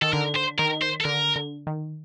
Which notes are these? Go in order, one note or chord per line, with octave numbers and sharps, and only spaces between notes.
D#3 A4
D3 A#4
C5
D#3 A#4
C5
A4
D3 A#4
D3
D#3